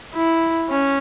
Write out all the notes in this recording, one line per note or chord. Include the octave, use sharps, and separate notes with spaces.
E4
C#4